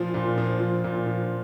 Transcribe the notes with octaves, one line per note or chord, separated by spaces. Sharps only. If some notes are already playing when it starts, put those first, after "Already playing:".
Already playing: A#2 F3
A#2
F3
F3
A#2
F3